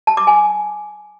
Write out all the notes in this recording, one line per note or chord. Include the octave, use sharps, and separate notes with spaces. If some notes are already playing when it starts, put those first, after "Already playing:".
A5
D6
G#5